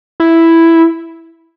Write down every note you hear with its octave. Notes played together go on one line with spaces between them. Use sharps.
E4